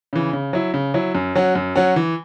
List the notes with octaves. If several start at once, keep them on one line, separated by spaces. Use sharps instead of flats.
C#3 E3
C#3
F#3 E4
C#3
F#3 E4
F#2
F#3 C#4 F#4
F#2
F#3 C#4 F#4
E3